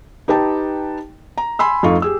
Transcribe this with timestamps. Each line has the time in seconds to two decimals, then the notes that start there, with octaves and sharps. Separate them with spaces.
0.28 D#4 G4 B4 G5 A5
1.38 A#5
1.59 G#5 B5 C6 E6
1.83 F2 A3 D#4 F4 C#6
2.02 G4 G#4 E6